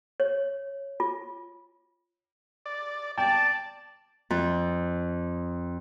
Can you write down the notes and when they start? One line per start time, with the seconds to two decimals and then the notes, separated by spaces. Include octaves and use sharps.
0.20 C#5
1.00 F4
2.66 D5
3.18 D5 G5 A5
4.30 F2